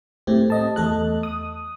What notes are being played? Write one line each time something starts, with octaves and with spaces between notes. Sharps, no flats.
A2 A3 C4 G4
C4 D#5 A5
E2 A3 A4 D#5 F#6
D#6